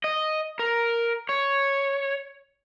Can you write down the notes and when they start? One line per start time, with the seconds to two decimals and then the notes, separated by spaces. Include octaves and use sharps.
0.04 D#5
0.59 A#4
1.29 C#5